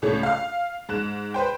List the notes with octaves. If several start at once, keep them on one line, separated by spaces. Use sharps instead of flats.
C#2 A2 A3 C#5
F5 F6
G#2 F#6 E7
B4 C5 G5